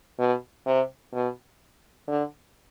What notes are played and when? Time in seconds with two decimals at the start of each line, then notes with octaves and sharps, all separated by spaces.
0.19 B2
0.66 C3
1.13 B2
2.08 D3